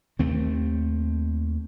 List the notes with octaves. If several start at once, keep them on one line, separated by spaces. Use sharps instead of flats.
D#2 D#3 A3 C4